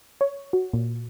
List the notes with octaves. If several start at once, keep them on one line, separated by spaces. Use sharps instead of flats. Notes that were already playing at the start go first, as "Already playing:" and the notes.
C#5
F#4
A#2